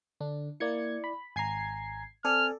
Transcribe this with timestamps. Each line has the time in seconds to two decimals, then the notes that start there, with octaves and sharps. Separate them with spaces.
0.21 D3 D4
0.60 A#3 E4 D5 G#6 C#7
1.04 B5
1.36 G#1 G#5 A#5 G#6 C7
2.25 C4 A4 D5 G#5 F6